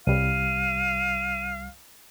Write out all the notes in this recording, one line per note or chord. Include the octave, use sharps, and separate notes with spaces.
C2 G3 F5 D#7